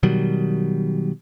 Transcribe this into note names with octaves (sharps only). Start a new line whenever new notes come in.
B2 D#3 F#3 G3